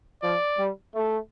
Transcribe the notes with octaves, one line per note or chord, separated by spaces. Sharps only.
F3 D5
G3
A3